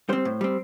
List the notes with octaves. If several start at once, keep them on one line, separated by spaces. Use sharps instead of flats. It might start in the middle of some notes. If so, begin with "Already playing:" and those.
G3 C4 C5
A2
G3 C4